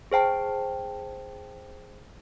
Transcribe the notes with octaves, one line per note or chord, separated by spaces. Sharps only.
G#4 C5 G5 A5